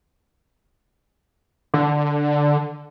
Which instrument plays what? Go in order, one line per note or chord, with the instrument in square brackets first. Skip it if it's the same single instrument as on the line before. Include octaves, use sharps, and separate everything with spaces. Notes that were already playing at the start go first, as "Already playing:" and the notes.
[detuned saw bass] D3